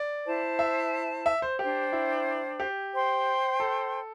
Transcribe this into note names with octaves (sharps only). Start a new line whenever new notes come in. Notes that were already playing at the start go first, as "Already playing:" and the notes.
Already playing: D5
E4 C5 A5
E5
E5
C5
D4 G4 C5 G5
E4
G4
C5 G5 C6
A4